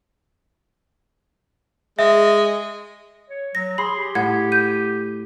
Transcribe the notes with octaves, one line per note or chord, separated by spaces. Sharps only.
G#3 E5
C#5
F#3 A#6
G#4 B5 C6
G4
A2 F#5 G#6
G6 D#7